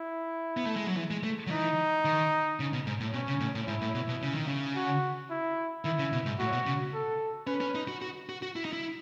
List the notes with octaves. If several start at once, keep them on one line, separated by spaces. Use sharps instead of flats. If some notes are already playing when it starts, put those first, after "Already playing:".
Already playing: E4
B3
A3
G#3
F#3
E3
G#3
A3
F#3
E3 D#4
D#3
C#3
B2
G#2
A2
B2 C#4
C#3
A2
A2
G#2 E4
A2
B2
B2
C#3
D#3
C#3
F#4
E4
D#3 E4
C#3
B2
G#2
A2 F#4
B2
C#3
A4
C#4 B4
C#4
D#4
F#4
F#4
F#4
F#4
E4
D#4
E4